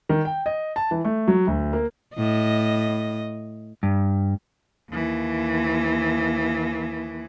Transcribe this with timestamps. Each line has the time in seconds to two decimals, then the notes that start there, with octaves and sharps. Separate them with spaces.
0.09 D#3
0.25 G5
0.46 D#5
0.76 A5
0.91 E3
1.05 A3
1.28 F#3
1.47 D2
1.73 A#3
2.15 A2 D#5
3.83 G2
4.90 D#2 E3